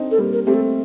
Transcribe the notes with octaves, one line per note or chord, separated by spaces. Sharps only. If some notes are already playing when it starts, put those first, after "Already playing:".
Already playing: C4 D4 D#4
A4
G3 A#3
A#4
A3 C4 G4
A4